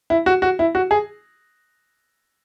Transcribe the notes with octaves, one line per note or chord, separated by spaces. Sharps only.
E4
F#4
F#4
E4
F#4
G#4